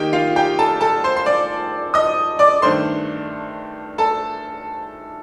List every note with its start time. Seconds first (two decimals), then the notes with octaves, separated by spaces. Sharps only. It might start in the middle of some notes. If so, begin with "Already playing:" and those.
Already playing: D#3 A#3 D#4 G4 G5
0.13 F4 F5
0.36 G4 G5
0.59 A4 A5
0.81 A4 A5
1.04 C5 C6
1.17 C6
1.26 D5 D6
1.94 D#5 D#6
2.39 D5 D6
2.62 G2 D#3 A3 D4 C5 C6
3.98 A4 A5